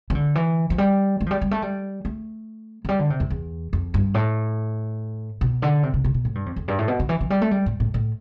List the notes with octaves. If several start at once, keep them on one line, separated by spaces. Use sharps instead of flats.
E3
D3
E3
F3
G3
A3
F3
G3
G3
A3
G3
A3
F3
G3
D3
C3
F2
E2
F2
G2
A2
B2
D3
C3
C3
C3
B2
A2
G2
F2
F2
G2
A2
B2
D3
E3
F3
G3
A3
G3
A2
A2
A2